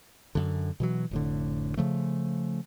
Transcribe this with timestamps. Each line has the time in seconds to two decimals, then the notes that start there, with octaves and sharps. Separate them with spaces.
0.35 F#2 D3
0.80 B2 E3 F#3
1.11 F1 A2 D3
1.77 C#3 F3 A3